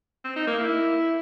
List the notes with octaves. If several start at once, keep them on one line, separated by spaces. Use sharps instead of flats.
C4
D#4
A#3
E4